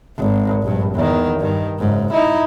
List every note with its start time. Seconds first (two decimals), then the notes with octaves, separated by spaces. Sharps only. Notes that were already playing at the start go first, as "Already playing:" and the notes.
0.18 G#1
0.63 A#1 G2
0.95 E2 D#3
1.39 G2 D#3
1.79 F#1 G#2
2.12 D#4 E4